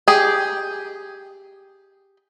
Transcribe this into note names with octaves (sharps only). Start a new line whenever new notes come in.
G4 G#4